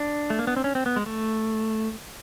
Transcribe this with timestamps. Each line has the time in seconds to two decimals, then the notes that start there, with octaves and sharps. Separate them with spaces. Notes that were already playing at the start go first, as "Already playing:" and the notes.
Already playing: D4
0.30 A3
0.39 A#3
0.47 B3
0.56 C4
0.64 C#4
0.75 C4
0.86 B3
0.96 G#3
1.06 A3